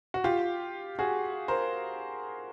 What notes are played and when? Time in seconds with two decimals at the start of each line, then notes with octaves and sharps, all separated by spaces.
0.14 F#4
0.24 F4 G4
0.99 F#4 G#4
1.48 A#4 C5